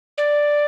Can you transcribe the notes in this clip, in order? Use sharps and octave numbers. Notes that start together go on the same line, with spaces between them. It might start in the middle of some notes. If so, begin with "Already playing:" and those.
D5